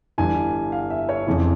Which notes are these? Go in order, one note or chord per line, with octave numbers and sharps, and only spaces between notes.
G1 G2 E3 G#5
F5
E5
C#5
F1 F2 C#3 E3